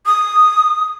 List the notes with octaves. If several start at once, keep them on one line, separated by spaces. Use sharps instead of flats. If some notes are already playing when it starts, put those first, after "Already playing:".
D#6